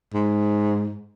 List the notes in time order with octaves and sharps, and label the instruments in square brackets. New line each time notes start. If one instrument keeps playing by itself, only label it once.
[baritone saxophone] G#2